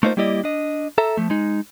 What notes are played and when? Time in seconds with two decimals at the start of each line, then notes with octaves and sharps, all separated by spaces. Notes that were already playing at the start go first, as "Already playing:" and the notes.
0.03 A3 A#3 D#4 F4 C5
0.17 G3 A#3 E4 G4 D5 D#5
0.44 D4 D#5
0.98 A4 E5 A#5
1.17 F3 A3
1.30 G#3 D#4